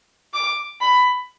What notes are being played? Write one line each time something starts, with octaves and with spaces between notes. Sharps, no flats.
D6
B5